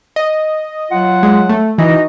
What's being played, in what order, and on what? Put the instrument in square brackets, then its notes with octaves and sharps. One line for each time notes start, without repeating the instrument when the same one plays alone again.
[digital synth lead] D#5
[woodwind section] F#3 F4 F#5
[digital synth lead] G#3
A3
[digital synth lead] E3 [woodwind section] D#4 F#4 D#5